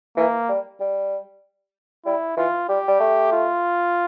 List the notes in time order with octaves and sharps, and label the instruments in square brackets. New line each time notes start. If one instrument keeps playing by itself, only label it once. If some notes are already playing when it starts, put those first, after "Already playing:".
[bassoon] E3 [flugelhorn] A#3
[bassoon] G3
G3
[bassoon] G3 [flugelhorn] E4
[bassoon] E3 [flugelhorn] F4
[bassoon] G3 [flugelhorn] G4
[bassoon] G3
A3
[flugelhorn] F4